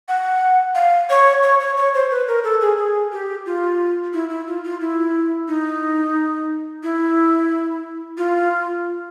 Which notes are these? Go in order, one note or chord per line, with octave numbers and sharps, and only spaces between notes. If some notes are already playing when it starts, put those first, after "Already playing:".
F#5
F5
C#5
C#5
C#5
C#5
C5
B4
A#4
A4
G#4
G#4
G4
F4
E4
E4
F4
F4
E4
D#4
E4
F4